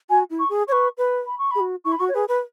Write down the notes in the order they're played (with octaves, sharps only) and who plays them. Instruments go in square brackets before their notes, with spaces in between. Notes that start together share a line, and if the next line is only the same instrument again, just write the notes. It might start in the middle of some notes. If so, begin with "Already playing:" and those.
[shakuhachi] F#4 [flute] G#5
[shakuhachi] E4
[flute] C#6
[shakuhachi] G#4
[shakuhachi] B4 C#5 [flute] C#6
[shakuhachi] B4
[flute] B5
C#6
[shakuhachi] G#4 [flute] B5
[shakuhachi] F#4
[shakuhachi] E4 [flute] C#6
[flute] B5
[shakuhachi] F#4 [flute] C#6
[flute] C#5
[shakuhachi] G#4 [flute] B4
[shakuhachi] B4